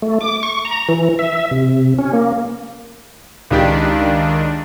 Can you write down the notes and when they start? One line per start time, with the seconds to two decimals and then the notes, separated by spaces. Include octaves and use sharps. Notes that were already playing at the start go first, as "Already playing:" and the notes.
0.02 A3
0.21 D6
0.43 C#6
0.65 A#5
0.89 E3
1.19 E5
1.51 C3
1.99 C#4
2.13 A#3
3.50 C#2 D#3 D4 G4